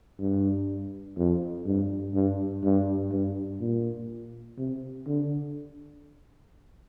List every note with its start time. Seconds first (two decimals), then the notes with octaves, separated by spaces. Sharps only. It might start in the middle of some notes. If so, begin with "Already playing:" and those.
0.19 G2
1.17 F2
1.66 G2
2.14 G2
2.64 G2
3.11 G2
3.61 A#2
4.58 C3
5.07 D3